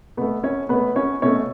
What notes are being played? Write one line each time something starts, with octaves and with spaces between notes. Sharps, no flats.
B2 A3 B3 B4
C#4 C#5
B2 A3 B3 B4
C#4 C#5
B2 A3 C#4 C#5